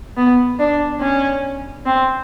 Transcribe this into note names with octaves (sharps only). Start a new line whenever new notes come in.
B3
D4
C#4
C4